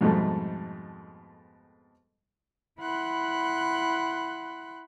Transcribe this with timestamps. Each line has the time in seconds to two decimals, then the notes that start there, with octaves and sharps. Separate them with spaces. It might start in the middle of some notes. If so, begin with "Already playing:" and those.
0.01 F2 G#2 B2 G3 A3
2.79 E4 F#5 B5 C6 F#6